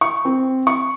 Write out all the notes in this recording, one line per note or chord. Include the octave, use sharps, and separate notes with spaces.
C#6
C4
C#6